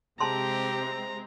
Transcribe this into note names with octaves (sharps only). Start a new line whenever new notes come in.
C3 G#3 C4 G4 A5 A#5 C6